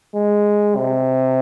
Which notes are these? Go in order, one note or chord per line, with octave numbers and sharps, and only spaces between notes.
G#3
C3